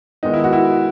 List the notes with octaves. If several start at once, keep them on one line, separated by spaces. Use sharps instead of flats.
D#3 G#3 B3 D#4
E4
F#4
E4